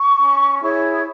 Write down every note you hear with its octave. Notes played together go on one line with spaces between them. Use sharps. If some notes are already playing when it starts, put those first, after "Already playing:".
Already playing: C#6
C#4
E4 G#4 C#5